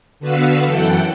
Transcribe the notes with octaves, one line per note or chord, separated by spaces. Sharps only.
D3 B3 F#4 B4 F5 E6
F#2 E3 A4 F#5 G5